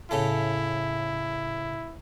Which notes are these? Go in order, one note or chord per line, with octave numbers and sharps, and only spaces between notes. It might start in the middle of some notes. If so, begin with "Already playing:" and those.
A2 C#3 A3 E4